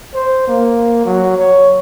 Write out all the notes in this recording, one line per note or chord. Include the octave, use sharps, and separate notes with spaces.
C5
A#3
F#3
C#5